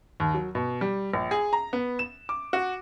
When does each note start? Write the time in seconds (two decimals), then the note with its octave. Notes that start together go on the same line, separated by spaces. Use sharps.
0.20 D#2
0.34 F#3
0.55 B2
0.81 G3
1.14 A#1
1.31 G#4
1.53 A#5
1.73 B3
1.99 E7
2.29 D6
2.53 F#4